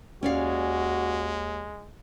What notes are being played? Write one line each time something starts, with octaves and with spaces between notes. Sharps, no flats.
D#2 G#3 C#4 F#4 D5 F5